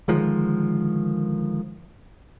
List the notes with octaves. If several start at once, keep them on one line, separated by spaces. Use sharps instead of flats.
D3 D#3 F3 G#3